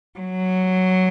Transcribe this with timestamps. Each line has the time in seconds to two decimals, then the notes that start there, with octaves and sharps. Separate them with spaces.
0.18 F#3